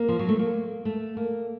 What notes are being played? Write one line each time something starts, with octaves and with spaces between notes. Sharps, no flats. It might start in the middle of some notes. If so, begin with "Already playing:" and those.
Already playing: A#3
F3
F#3
A3
A#3
A3
A#3